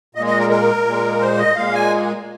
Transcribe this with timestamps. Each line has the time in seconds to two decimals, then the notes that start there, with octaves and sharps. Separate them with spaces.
0.15 A#2 D#5
0.19 G#3
0.26 D#5
0.39 A#4
0.50 A#4
0.86 A#2 G#3
1.21 C5
1.38 D#5
1.56 A#2 G#3 F5
1.74 G#5